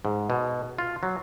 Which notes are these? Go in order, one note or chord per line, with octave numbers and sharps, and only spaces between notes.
G#2
B2
F4
F#3